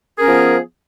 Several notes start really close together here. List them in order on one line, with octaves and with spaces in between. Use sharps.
G#4 A#4 C#4 B3 F3